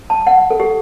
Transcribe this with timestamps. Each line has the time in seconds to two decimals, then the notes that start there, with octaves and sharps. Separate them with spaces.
0.10 A5
0.27 F#5
0.50 A4
0.60 G4